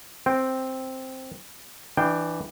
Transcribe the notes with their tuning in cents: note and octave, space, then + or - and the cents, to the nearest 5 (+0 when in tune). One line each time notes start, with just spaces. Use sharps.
C4 +0 G5 +0
E3 +0 D4 +20 G5 +0